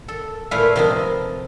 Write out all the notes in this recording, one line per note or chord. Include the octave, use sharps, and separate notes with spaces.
A4
A#2 A3 E4 B4 F5 G#5
C3 F3 D#4